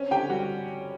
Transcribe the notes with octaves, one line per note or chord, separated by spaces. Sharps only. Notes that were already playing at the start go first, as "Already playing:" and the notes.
Already playing: C4 C#4 C#5
D3 G4 G5
G3 F#4 F#5